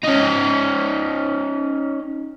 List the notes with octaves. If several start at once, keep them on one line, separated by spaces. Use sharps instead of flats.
C#4 D#4